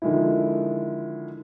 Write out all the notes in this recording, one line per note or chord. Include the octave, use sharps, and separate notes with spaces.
D3 D#3 F3 G#3 D#4 E4